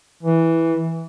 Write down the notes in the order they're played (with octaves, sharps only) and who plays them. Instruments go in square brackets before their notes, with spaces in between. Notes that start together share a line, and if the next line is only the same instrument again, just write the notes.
[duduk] E3